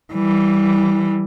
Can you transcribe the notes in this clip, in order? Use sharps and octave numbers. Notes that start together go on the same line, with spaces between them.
E3 G3